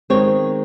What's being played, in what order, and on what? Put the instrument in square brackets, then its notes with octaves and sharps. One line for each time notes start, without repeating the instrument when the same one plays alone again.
[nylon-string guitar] D#3 G#3 C4 C#5